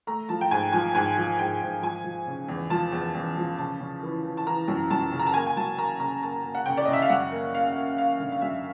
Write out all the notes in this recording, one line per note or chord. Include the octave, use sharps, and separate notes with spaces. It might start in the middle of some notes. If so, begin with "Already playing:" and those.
A3 A#5
F3 A5
G5
G#2 G#5
F3 G#5
G#2 G#5
F3
G#2 G5
G#2
F3 G#5
F3
C#3
E2
F3 A5
E2
E2
F3
C#3 A5
C#3
E3
E3
A5
E3 A#5
F#2
F#2 A5
C#3
A#5
A5
A#3 G#5
G#5
F#3 A5
A#3 A#5
C#3 A#5
A#3 A5
A#3
F#5
C#3 G5
D5
C#3 D#5
E5
F5
F#2 F#5
A#3
A#3 F5
A#3
A#3 F5
D3
F5
F#2 E5